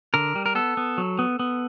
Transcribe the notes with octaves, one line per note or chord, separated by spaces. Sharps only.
D3 A#4
G3
A#4
B3 A4
B3
F#3
B3
B3